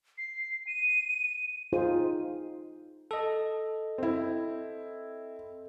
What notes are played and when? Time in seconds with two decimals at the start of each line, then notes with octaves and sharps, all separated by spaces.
0.18 C7
0.67 D#7
1.73 D#4 F4 G#4 C5
3.11 A4 D#5
3.98 C4 E4